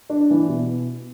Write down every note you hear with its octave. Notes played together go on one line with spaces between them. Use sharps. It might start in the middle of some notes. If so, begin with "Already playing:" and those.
D4
E3
B2